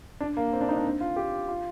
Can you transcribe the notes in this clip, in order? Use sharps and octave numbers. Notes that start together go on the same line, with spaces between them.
D4
A#3
C4
D4
D#4
D4
C4
F4
G4
F4